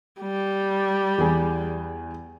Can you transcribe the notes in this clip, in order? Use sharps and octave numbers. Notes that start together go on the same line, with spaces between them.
G3
E2 G#4